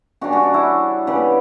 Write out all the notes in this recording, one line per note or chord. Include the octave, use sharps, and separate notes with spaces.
C#3 G3 C#4 D4 F#4
D4 F#4
D4
E4
C#3 G3 B3 B4 D5